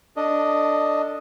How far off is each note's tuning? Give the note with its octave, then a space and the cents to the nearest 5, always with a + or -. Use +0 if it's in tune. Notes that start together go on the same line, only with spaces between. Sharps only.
D4 +0 A4 +25 D#5 +0